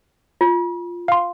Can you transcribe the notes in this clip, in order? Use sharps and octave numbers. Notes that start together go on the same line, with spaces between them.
F4
F5 C6